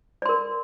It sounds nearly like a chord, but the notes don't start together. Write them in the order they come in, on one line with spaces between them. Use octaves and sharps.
D5 C6 A#4